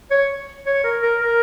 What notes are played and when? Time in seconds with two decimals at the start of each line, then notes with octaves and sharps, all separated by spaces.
0.11 C#5
0.66 C#5
0.84 A#4
1.02 A#4
1.21 A#4